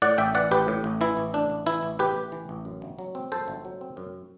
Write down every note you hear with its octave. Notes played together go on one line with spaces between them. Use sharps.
A2 D5 F#5
A1 E5 G5
E3 D5 F#5
A1 G4 B4
A2
A1
E3 E4
A1
A2 D4
A1
E3 E4
A1
A2 G4 B4
A1
E3
A1
F#2
G1
F#3
C4
F#2 A4 C5
G1
F#3
C4
F#2